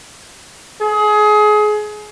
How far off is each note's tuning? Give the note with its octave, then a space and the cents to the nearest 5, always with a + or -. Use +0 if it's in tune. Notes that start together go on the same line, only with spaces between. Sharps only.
G#4 +25